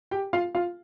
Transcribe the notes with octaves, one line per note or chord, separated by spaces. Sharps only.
G4 G5
F4 F5
F4 F5